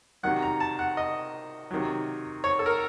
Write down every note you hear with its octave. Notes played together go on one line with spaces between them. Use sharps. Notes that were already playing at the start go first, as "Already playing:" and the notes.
C3 D#3 F#3 F#5
A#5
A5
F#5
D#5
C3 D#3 F#3
C#5
A4
A#4